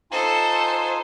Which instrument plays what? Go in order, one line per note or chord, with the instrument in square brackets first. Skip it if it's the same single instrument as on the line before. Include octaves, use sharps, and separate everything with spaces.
[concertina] D#4 F4 G#5 [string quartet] A4 C5